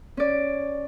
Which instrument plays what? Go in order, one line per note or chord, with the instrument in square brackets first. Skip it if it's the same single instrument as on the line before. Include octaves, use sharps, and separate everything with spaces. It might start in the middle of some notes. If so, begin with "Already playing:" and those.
[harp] C#4 D5